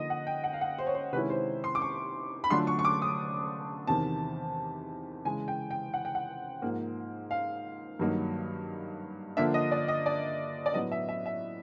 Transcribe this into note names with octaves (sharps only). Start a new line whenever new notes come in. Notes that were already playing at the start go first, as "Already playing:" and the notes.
Already playing: D3 F3 A#3 D#4 D#5
F#5
G5
F#5
F5
F#5
C5
C#5
C5
C3 D#3 G#3 C#4 E4 B4
C5
C6
D6
C#6
B5
D3 F#3 A3 D4 F4 C6
C#6
C#6
D6
D#6
E2 C3 D#3 A5
C#3 E3 G#3 G#5
G5
G5
F#5
G5
F#5
G#2 F3 A#3
F5
G2 D#3 F#3 A#3 D#4
D3 F3 A#3 D4 E5
D#5
D5
D#5
D5
D5
A2 F#3 B3 D#5
E5
E5
E5